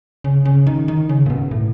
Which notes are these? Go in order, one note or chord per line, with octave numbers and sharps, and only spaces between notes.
C#3
C#3
D#3
D#3
C#3
A#2
B2
A2